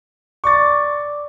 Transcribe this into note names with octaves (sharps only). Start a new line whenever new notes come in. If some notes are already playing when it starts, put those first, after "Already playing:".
D5 C#6 D6 A6